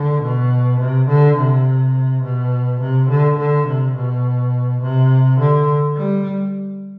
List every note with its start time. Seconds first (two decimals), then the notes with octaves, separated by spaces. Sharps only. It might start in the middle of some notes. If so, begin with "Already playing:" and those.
Already playing: D3
0.22 B2
0.80 C3
1.09 D3
1.37 C3
2.23 B2
2.81 C3
3.10 D3
3.38 D3
3.67 C3
3.96 B2
4.82 C3
5.40 D3
5.97 G3